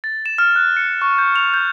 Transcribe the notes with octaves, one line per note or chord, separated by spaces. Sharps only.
A6
E7
F6
F#6
C#7
C#6
G6
F7
G6